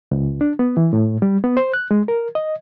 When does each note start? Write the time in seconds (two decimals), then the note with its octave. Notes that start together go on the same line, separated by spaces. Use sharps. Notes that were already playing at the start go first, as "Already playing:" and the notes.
0.11 C#2
0.41 D4
0.59 B3
0.77 E3
0.93 A2
1.22 G3
1.44 B3
1.57 C5
1.74 F#6
1.91 G#3
2.08 A#4
2.35 D#5